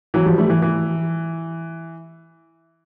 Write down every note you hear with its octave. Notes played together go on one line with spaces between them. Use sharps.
E3 F#3
F3 G3
G3 A3
E3
E3